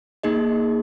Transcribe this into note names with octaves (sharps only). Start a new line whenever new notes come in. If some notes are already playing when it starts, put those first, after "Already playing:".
A#3 D#4 G#4 D#5